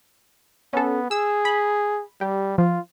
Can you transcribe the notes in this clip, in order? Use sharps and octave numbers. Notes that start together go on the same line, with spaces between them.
B3 C#4 A4
G#4 E6
B5
G3 G4
F3 F4